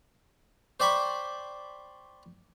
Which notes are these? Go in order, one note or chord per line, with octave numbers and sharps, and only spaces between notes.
C5 D5 G5 B5 C#6